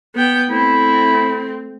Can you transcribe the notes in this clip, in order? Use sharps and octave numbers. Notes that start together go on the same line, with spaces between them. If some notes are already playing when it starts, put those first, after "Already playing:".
B3 G5
A3 C4 E4